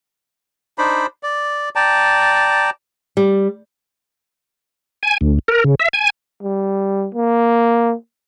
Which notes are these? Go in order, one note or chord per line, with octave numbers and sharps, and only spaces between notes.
D4 D#4 C5 B5
D5
D5 G5 A5 A#5
G3
G#5
D2
A#4
C#3
E5
G#5
G3
A#3